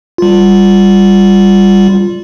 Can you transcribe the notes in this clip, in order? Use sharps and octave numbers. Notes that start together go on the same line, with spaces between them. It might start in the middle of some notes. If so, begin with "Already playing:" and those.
G3 F4